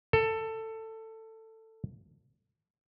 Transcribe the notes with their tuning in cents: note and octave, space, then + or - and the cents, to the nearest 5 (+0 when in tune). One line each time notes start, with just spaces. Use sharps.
A4 +15